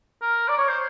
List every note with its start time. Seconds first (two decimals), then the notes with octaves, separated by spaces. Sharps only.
0.22 A#4
0.48 D5
0.58 C#5
0.68 C5